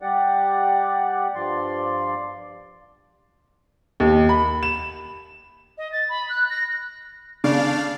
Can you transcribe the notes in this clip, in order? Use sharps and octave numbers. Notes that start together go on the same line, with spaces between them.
G3 G4 D5 F#5
G2 F3 D5 C6
D#2
B5
E7
D#5
A6
B5
F#6
A#6
C#3 D4 D5 F5